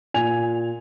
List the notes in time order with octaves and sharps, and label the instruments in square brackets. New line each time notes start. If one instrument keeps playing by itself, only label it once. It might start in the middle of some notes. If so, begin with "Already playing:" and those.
[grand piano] A#2 G#5 G#6 F7